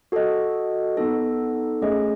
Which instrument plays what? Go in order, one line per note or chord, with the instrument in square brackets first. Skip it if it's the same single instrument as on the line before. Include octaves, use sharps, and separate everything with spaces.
[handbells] F#4 A4 D#5
B3 D#4 A4
A3 C#4 G#4 D#5